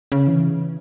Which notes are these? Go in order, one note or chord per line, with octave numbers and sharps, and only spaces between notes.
C#3
E3